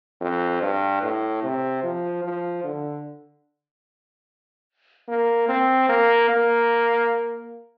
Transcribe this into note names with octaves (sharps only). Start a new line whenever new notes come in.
F2
G2
A2
C3
F3
F3
D3
A#3
C4
A#3
A#3